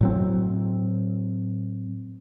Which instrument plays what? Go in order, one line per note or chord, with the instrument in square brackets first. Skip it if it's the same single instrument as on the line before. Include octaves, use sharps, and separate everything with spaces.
[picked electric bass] A2 F#3 C4